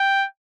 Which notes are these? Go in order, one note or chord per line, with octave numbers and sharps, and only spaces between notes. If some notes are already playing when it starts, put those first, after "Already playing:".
Already playing: G5